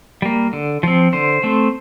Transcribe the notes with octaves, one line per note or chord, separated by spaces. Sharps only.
G3 A#3
D3
F3 C4
D3 C5
A3 C4